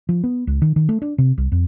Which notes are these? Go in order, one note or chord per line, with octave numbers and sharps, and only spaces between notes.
F3
B3
C#2
D#3
D#3
A3
D4
C3
C2
F2